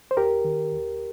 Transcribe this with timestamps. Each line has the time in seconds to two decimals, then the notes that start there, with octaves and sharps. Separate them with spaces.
0.11 C5
0.17 D#2 G4 A#4
0.45 D#3
0.73 D#2